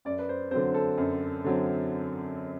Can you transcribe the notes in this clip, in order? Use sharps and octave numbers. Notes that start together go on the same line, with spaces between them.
F#2 D5
B4
C5
D3 F#3 C4 C5
A4
F#2
D3 F#3 C4